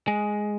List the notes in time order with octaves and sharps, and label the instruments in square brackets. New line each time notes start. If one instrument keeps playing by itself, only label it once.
[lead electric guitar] G#3